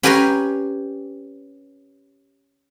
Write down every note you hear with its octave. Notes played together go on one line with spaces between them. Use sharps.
C#4 G4 B4 G#5 A#5 C6